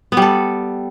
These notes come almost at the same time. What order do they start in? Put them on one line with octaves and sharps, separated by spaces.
B3 G3 A4